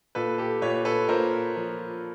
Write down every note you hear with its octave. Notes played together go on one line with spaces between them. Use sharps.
A#2 A4 B4
G4 A4
A#2 B4 C#5
A4 B4
A#2 A#4 C5
F3